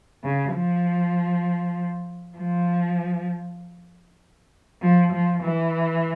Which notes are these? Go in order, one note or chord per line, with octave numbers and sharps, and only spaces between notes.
C#3
F3
F3
F3
F3
E3